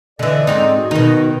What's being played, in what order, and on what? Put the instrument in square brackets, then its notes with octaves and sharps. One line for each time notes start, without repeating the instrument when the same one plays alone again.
[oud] D3 E3 [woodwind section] A4 D5 D#5
[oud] G#2 C4 D#4
[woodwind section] F#4 G#4
[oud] B2 D#4 [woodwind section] D#3